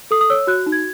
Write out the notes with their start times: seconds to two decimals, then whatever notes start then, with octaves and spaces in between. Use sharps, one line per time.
0.11 A4 D#6
0.21 D#6
0.30 C#5 E6
0.47 F#4 F#6
0.66 D#4
0.72 G#6